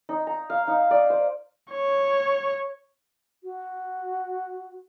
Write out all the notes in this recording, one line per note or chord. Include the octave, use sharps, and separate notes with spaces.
D#4
A#5
F5
D#4
D5
C5
C#5
F#4